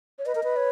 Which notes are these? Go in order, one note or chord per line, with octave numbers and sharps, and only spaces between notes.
C#5
B4 D#5
A#4
B4
C#5